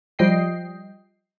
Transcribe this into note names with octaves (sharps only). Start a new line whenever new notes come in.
F3 G3 D#5 G5 C7